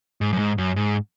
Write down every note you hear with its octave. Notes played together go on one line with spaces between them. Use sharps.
G#2
F#2
G#2
F#2
G#2